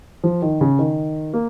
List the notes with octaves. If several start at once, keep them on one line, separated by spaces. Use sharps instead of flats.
F3
D#3
C#3
D#3
A#3